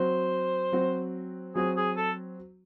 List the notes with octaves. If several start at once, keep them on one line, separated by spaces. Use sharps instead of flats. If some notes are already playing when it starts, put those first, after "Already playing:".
Already playing: F#3 C4 F#4 C5
F#3 C4 F#4
F#3 C4 F#4 G#4
G#4
A4